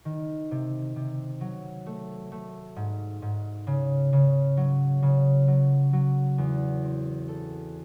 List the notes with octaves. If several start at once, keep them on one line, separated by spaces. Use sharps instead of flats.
D#3
C3
C3
F#3
A3
A3
G#2
G#2
C#3
C#3
F#3
C#3
F#3
F#3
E2
C4
A4